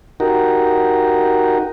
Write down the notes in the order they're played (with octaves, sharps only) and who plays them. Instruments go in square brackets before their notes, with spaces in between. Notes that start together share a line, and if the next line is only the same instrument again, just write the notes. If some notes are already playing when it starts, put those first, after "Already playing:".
[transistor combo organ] D#4 F#4 G4 A#4